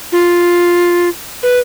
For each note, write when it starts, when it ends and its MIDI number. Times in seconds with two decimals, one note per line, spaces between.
0.12 1.09 65
1.43 1.59 71